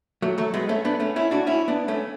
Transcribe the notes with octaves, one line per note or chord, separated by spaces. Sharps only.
F#3 A3
F#3 A3
G#3 B3
A3 C#4
B3 D4
A3 C#4
C#4 E4
D4 F#4
C#4 E4
B3 D4
A3 C#4